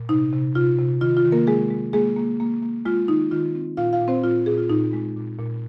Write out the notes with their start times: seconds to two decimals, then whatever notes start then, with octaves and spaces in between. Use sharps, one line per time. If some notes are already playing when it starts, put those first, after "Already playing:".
Already playing: A#2
0.09 C3 D#4
0.33 C3
0.55 C3 F4
0.79 C3
1.01 D#3 F4
1.17 F4
1.25 D#3
1.32 A#3 A#4
1.47 G#3 G#4
1.70 G#3
1.93 G#3 A#3 G#4
2.16 A#3
2.40 A#3
2.62 A#3
2.85 G#3 F4
3.08 D#3 D#4
3.31 D#3 F4
3.55 C4
3.77 A#2 F4 F5
3.93 F4 F5
4.01 A#2
4.08 C4 C5
4.24 A#2 F4
4.46 A#2 G#4
4.58 F4
4.70 A#2 D#4
4.93 G#3
5.16 A#2
5.39 A#2